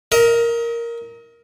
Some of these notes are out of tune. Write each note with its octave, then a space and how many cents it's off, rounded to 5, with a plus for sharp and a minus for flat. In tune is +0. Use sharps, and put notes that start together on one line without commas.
A#4 +0 D#5 +40